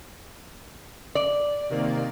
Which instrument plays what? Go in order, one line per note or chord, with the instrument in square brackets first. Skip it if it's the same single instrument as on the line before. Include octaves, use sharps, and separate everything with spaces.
[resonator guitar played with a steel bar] D5
[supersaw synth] C3 D#3 A#3